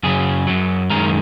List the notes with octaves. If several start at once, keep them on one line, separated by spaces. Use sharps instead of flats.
F#2 C#3 F#3 G#4
F#2 F#3
F#2 D#3 G#3 A#4